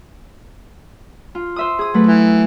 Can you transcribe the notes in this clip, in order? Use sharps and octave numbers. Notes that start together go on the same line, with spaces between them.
F4
C5 E5 D#6
G#4 D#6
F#3 A3 B4
E3